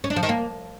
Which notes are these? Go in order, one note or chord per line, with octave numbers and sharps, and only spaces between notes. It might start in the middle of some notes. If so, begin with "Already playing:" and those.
C#4
D4
F3
D#3
A#3